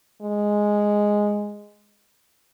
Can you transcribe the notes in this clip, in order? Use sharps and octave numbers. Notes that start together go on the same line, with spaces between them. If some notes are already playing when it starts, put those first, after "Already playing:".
G#3